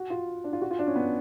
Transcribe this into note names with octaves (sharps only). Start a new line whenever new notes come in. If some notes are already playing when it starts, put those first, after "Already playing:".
Already playing: F#4
F4
D4
F4
F#4
F4
D4
C#4
B3